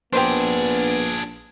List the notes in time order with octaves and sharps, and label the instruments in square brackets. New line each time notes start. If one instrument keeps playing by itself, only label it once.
[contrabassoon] A#1 [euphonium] B3 [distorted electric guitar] D4 G#4 [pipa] G4 B4 C5